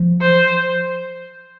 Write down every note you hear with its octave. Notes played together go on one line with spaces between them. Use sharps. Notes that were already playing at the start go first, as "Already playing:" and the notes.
Already playing: F3
C5